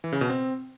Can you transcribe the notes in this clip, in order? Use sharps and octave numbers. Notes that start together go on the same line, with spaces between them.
E3
C#3
B2
C4